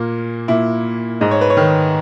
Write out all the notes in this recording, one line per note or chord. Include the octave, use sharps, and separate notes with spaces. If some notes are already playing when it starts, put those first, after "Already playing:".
Already playing: A#2 A#3
A#2 E4
G#2 D#5
C#5
B4
C#5
D#3